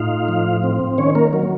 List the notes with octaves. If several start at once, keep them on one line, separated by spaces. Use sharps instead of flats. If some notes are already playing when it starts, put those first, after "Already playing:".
Already playing: A2 D#4 F4 F5
F3
C4
D#3 C#4 C#5
A#3 A#4
F#3